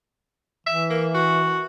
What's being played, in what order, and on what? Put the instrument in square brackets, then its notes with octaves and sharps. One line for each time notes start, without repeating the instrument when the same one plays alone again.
[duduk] E3 [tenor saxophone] E5
[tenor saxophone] A#3
F#4